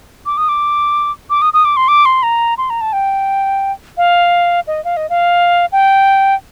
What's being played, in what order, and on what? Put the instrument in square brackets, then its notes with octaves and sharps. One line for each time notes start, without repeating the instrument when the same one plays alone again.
[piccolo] D6
D#6
D6
D6
D#6
D#6
D6
C6
D6
C6
A#5
C6
A#5
A5
G5
F5
D#5
F5
D#5
F5
G5